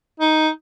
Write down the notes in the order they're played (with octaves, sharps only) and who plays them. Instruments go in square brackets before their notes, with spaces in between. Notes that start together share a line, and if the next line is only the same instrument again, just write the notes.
[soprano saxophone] D#4